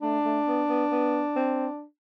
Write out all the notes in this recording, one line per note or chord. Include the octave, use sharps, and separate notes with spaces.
A3 D4
A3
B3
B3
B3
C4